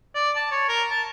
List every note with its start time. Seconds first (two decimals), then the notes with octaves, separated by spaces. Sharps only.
0.15 D5
0.36 A5
0.51 C#5
0.68 A#4
0.90 A5